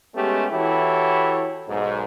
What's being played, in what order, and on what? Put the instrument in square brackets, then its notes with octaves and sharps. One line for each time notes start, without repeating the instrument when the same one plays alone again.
[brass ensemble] G#3 A3 B3 C#4 G4
E3 E4 F#4 G4 A4 C#5
B1 G#2